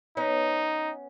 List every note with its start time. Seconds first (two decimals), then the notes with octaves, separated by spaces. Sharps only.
0.17 B3 C#4 D#4